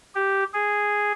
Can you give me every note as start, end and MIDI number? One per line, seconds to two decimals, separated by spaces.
0.15 0.44 67
0.53 1.12 68